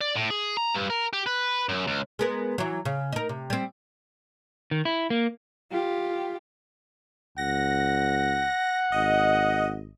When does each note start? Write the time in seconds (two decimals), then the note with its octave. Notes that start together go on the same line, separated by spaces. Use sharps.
0.01 D5
0.16 A2
0.30 G#4
0.57 A#5
0.74 G2
0.90 A#4
1.13 G4
1.26 B4
1.69 F#2
1.87 C#2
2.19 G#3 B3 A#4
2.58 E3 F#3
2.85 C#3
3.13 D#4 A#4
3.29 C3
3.50 G3 C4
4.71 D#3
4.85 E4
5.10 A#3
5.71 F4 G4
7.38 C#2 F#5 A#6
8.92 G#1 D#5